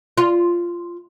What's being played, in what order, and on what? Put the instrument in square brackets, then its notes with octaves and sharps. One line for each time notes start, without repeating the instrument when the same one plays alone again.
[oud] F4